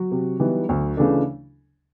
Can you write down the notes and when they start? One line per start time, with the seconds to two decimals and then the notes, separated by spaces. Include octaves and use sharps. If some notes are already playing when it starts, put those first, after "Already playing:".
Already playing: F#3 F#4
0.11 C3
0.39 E3 G3 B3 D#4
0.69 D2
0.97 C#3 E3 A3 D4